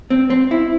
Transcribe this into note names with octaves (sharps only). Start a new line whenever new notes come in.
C4
C4
E4